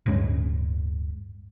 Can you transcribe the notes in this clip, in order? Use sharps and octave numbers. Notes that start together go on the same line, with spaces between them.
D1 G2 G#3 C#4